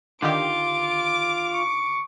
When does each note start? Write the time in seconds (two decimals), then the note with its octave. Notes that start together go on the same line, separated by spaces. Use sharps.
0.22 D3 D#3 F4 G4 D6
1.53 C#6